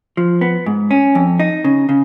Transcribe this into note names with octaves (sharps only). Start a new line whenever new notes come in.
F3
B3
G#2
C#4
F2
D#4
C#3
C#3